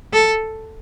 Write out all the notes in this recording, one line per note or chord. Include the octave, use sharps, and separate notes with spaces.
A4